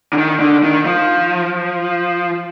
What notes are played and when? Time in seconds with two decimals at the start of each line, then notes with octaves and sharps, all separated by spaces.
0.13 D3
0.17 D#3
0.40 D3
0.64 D#3
0.86 F3